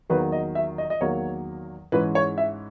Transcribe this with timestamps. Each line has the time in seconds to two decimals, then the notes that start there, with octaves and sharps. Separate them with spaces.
0.10 E2 D#3 F#3 A#3 B4
0.32 D#5
0.55 E5
0.78 D#5
0.90 D#5
1.01 E2 D#3 F#3 A#3 C#5
1.92 G#2 E3 G#3 C#4 B4
2.15 C#5
2.38 E5